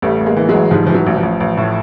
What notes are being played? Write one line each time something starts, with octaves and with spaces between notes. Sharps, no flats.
A1 G3 A3
A1
G#3 A#3
E3
F#3 G#3
A1
G#2 F3 G3
E3 F3
F#3
A1
F3
A1
A1
A2